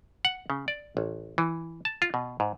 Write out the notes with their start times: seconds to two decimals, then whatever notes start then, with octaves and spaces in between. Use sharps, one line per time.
0.25 F#5
0.50 C#3
0.68 D5
0.97 A1
1.38 E3
1.85 A5
2.02 F4
2.14 B2
2.40 G#2